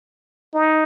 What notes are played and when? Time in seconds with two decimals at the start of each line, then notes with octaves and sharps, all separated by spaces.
0.54 D#4